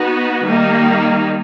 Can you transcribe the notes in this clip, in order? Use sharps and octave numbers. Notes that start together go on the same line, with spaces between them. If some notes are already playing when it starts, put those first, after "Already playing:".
Already playing: B3 D#4 F#4
D#3 G3 A#3 D#4